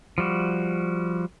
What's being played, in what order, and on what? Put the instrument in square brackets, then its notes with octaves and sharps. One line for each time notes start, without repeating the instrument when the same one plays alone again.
[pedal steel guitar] F3 G3 F#4